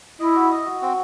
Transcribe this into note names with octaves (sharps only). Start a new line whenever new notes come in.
E4 D#5
F#4
D#5
F#4
C4